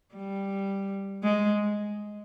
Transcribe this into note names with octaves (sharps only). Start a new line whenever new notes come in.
G3
G#3